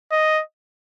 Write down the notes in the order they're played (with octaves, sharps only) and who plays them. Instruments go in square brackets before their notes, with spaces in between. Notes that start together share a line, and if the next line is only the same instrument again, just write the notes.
[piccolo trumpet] D#5